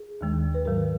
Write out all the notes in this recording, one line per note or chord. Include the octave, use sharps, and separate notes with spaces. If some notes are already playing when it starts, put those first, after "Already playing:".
Already playing: G#4
D#2 D#3 G#3
B4
G#2 D#3 F#3 A#4